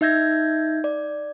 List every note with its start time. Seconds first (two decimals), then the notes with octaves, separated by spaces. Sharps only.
0.01 D#4 E5 G6 G#6 A#6
0.84 D5